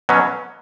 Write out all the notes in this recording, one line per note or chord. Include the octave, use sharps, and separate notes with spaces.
B2 F#3 C#4